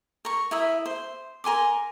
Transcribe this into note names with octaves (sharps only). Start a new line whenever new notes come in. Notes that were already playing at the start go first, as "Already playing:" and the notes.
A#4 C#6
E4 A#4 D#5 E5
C5
A#4 G#5 C6 D6